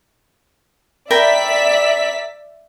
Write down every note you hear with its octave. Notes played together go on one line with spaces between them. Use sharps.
A#4 D5 E5 G5 B5 B6